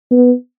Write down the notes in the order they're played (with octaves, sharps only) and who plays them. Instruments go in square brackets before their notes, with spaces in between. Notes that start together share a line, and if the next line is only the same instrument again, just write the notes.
[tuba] B3